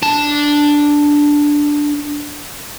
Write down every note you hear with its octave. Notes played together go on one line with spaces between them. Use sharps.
D4 A5